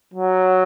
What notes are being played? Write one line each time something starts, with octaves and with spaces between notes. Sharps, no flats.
F#3